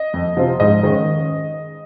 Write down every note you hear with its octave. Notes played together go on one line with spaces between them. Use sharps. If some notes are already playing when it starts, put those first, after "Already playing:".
Already playing: D#5
F2
C3 F3 C4 F4
G#2 D#5
D#3 G#3 C#4